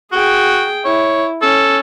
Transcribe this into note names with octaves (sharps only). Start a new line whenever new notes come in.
F#4 G#4 G5
E4 C#5
C#4 A4